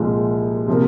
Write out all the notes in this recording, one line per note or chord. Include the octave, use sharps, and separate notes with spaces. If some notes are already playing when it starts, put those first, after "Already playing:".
Already playing: C2 A#2 F3 G#3
C3 F3 A#3